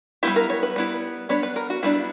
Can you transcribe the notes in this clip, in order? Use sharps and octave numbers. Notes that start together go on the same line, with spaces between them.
G3 B3 E4 G4
A#4
C#5
B4
G3 B3 E4
G3 B3 D4 C#5
B4
A#4
F#4
G3 B3 D4 E4